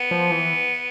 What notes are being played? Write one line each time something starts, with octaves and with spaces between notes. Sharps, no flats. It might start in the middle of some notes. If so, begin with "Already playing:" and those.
Already playing: B3
F3
E3